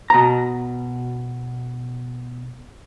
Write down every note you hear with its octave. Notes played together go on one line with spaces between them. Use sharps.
B2 A#5